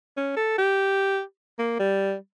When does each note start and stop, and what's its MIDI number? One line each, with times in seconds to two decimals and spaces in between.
0.17 0.33 61
0.36 0.54 69
0.58 1.21 67
1.59 1.75 58
1.79 2.14 55